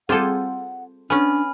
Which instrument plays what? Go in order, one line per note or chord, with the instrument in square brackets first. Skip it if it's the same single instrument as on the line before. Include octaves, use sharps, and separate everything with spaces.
[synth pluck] G3 C4 G#4 [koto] F4 A4 [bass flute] F#5
[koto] B3 C#4 [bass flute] D4 [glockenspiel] G#5 B5 F6